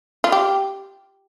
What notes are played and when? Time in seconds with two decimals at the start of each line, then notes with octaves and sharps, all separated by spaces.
0.24 F4
0.32 G4